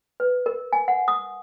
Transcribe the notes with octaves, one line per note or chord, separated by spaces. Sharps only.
B4
A#4
G#5
F#5
D#6